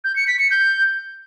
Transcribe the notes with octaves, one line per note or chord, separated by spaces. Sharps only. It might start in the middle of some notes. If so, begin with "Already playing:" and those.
G6
C#7
B6
C#7
G6